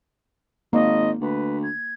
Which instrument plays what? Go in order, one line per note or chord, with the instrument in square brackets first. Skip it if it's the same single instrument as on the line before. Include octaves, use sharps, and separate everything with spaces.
[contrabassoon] G#1 [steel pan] A#3 [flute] D#5
[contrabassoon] D2 [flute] B4
[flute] G#6